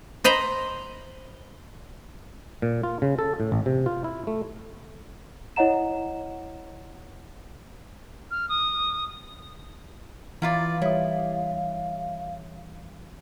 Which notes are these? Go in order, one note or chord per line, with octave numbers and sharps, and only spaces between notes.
C5 D#5 A#5 B5
A#2
F4
C#3
A4
A2
A1
C3
F4
E4
A3
E4 C#5 D#5 F#5 A#5 E7
F6
D#6
E3 E4 F4 D5 F5 A#5 F6
G3 E4 C#5 E5 D#6